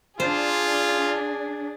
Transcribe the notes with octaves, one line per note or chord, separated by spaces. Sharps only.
D4 F4 G#4 C5